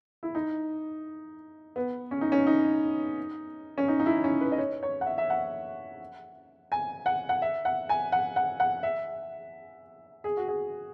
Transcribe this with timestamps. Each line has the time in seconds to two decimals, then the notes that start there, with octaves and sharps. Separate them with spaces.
0.23 E4
0.35 D#4
1.76 B3
2.11 C#4
2.21 D#4
2.32 C#4
2.47 D#4
3.78 C#4
3.88 D#4
4.00 D#4
4.06 E4
4.24 C#4
4.41 B4
4.52 D#5
4.58 C#5
4.83 C#5
5.01 F#5
5.06 E5
5.18 E5
5.30 F#5
6.72 G#5
7.06 F#5
7.29 F#5
7.42 E5
7.65 F#5
7.89 G#5
8.12 F#5
8.36 F#5
8.60 F#5
8.83 E5
10.24 G#4
10.37 F#4
10.48 G#4